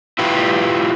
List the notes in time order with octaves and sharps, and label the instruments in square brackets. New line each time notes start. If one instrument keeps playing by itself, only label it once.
[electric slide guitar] E4 F4 G4 B4